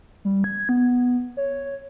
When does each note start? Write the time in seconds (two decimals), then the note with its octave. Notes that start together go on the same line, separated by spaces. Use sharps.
0.25 G3
0.44 G#6
0.69 B3
1.37 C#5